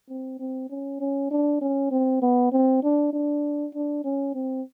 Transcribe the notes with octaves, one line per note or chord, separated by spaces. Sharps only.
C4
C4
C#4
C#4
D4
C#4
C4
B3
C4
D4
D4
D4
C#4
C4